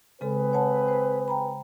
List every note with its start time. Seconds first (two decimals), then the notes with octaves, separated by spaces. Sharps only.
0.21 C#3 G#3 C4 G#4 A4 B4
0.53 C#5 F#5 A5
0.88 C5
1.28 G5 A#5 B5